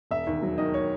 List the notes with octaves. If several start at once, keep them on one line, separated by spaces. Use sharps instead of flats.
E1 E5
D#2
F#3
D#3 D#5
C#5